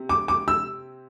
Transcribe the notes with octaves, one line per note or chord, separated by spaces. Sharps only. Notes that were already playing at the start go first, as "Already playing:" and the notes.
Already playing: C3
D6
D6
E6